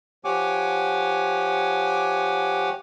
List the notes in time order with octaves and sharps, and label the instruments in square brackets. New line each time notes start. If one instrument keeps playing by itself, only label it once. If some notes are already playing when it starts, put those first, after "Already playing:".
[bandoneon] F3 G4 C#5 F#5 G#5 D6